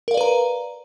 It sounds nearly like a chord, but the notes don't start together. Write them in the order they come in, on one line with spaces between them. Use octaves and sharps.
A#4 F5 D5 B4 A#5